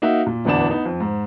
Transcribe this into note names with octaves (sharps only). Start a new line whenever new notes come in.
A#3 D#4 F#4 E5
A#2
D1 E2 B3 D4 E7
B3 D#4
F2
G#2